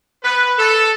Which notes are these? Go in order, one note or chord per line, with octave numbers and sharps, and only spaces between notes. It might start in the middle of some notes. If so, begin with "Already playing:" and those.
B4
A4